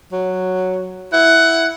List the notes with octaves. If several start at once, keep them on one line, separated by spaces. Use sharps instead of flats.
F#3
E4 F#5